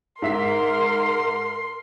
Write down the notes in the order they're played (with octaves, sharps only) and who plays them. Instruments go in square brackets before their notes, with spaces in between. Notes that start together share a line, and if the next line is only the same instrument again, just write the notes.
[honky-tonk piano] G#2 E5 B6 [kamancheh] A#4 [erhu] C6